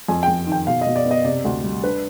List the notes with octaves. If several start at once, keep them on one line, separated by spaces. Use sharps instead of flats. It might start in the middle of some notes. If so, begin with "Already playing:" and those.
F2 G#5
G5
F2
D#3
G5
B2 F5
D#5
B2
D5
B3
D#5
C3 D5
D2
G3
D4 B4